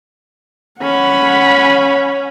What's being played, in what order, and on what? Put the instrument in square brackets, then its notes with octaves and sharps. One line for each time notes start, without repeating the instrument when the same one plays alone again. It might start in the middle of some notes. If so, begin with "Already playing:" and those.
[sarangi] C#4 [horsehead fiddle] F#5 B5